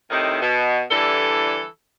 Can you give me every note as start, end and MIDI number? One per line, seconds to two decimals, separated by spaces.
0.11 0.38 45
0.11 0.38 48
0.11 0.38 51
0.11 0.38 63
0.11 0.38 64
0.42 0.83 47
0.90 1.65 50
0.90 1.65 52
0.90 1.65 55
0.90 1.65 64
0.90 1.65 69